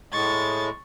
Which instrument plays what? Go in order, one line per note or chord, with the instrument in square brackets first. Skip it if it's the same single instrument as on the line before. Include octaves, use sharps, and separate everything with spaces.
[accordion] A2 G#3 [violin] C#6 A6